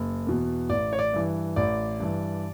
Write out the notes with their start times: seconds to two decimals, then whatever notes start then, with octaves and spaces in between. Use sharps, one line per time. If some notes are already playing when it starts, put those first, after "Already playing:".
Already playing: F#1
0.27 E2 B2
0.69 A1 D5
0.93 C#5
0.99 D5
1.13 G2 E3
1.56 A1 D5
2.00 G2 E3